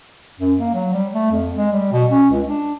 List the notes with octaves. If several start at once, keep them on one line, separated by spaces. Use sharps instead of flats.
F#2
A#3
F#3
G3
A3
F2
G#3
G3
B2
C#4
C#2
D4